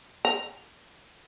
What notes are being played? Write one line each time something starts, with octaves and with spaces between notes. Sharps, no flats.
A#5